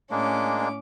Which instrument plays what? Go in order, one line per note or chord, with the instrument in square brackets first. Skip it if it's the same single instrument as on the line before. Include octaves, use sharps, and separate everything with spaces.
[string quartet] A2 C#4 D6 [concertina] G#3 A#3 D4